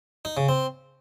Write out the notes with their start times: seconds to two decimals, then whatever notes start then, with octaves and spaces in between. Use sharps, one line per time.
0.25 D#4
0.37 C#3
0.49 C4